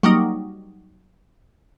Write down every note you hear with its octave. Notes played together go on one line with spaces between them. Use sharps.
F#3 G3 A#3 D#4